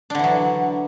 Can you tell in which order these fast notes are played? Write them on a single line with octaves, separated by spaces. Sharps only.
D4 D3 E3 F#3